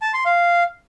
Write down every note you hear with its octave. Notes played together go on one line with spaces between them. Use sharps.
A5
C6
F5